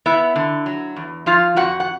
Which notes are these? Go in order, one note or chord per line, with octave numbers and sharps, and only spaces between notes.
B3 E4 E5
D3
F#3
E2
F3 F4 F5
F2 F#4 F#5
F#5